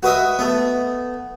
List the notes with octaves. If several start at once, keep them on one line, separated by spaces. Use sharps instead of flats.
F#4 B4 D#5 E5
A3 B3